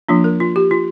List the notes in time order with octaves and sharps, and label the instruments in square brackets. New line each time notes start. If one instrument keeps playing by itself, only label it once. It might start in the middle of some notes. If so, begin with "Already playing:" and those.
[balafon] F3 A#3 D4 F4
A#4
F4
G4
F4